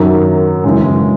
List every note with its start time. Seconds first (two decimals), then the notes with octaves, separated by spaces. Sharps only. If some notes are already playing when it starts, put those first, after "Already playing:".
Already playing: F#2 D#3 F#3
0.64 F#2 C#3 E3 G#3
0.83 G#3